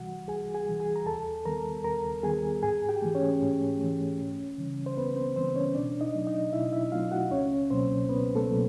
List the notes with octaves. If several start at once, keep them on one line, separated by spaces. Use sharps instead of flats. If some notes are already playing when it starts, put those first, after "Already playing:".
Already playing: C#2 C3 E3 G3 F#4 F#5
C#2 G#4 G#5
G#4 G#5
C3 E3 G3
G#4 G#5
A#5
D#2 A4 A5
D#3 G3 B3 A#4 A#5
D#2 A#4 A#5
D#3 G3 B3 G#4 G#5
G#2 G#4 G#5
G4 G5
E3 A3
C#4 C#5
G#2
E3 A3
C#2
C#3 E3 G3
C5
C#2 B3 B4
C4 C5
C#3 E3 G3 C4 C5
C#4 C#5
B2 D4 D5
D#4 D#5
F#3 A3 C4
D#4 D#5
B2 E4 E5
E4 E5
F#3 A3 C4 F4 F5
F#4 F#5
C#2 C#4 C#5
B2 F#3 A#3 C4 C5
C#2 B3 B4
A3 A4
B2 F#3 A#3